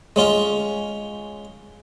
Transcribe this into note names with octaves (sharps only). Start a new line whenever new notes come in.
G#3 C#4 F4